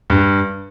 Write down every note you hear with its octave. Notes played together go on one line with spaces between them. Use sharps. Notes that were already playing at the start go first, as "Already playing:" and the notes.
G2